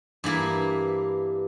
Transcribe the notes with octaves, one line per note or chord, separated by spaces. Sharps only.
G2 E3 A#3 E4